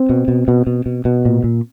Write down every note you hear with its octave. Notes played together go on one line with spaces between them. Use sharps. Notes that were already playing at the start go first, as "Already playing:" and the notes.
Already playing: C4
B2
B2
B2
B2
B2
B2
A#2
A#2